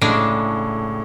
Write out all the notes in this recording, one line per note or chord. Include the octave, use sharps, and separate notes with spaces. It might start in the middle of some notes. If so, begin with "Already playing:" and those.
A2 C#3 G#3 D4